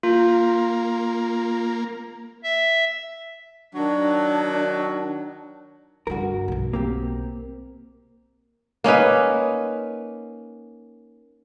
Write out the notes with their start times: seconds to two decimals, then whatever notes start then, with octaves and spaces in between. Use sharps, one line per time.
0.03 A#3 F4
2.44 E5
3.73 D#3 F#3 D4
6.07 G2 D3 F#4 A#4
6.48 B1 B2
6.73 A#3 C4 G4
8.84 A#3 C#4 D#4 B4